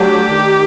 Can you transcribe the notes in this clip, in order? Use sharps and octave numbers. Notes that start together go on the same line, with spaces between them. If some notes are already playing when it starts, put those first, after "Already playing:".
Already playing: F#3 A3 D4 G4
D#3